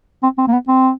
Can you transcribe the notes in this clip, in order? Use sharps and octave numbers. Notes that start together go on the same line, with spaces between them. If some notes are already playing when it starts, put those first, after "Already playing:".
C4
C4
A#3
B3
C4